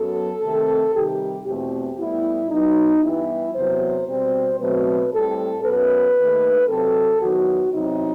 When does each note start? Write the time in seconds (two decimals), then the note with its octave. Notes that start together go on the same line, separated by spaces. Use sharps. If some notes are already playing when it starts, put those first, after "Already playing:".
Already playing: F#2 F#3 B3 A4
0.42 C3 D#3 A3 C4
0.94 C3 D#3 G3 G4
1.46 E2 B2 A3 C4 G4
1.99 A2 G3 B3 E4
2.50 B2 F#3 B3 D#4
3.03 G2 E3 G3 B3 E4
3.55 E2 C3 F#3 B3 C5
4.08 B2 G3 C4 C5
4.60 B2 F#3 A3 C4 B4
5.12 A2 G3 C4 A4
5.64 F#2 F#3 B3 B4
6.16 D#2 D#3 A3
6.69 C3 F#3 C4 A4
7.21 E2 D#3 F#3 B3 F#4
7.73 E2 C3 F#3 C4 D#4